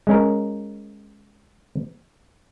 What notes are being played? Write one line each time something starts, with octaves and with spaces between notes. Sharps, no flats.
G#3 C#4 A#4